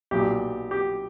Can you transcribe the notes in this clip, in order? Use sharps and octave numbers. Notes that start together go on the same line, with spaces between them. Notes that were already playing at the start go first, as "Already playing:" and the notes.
B1 A#2 F#3 G4
G4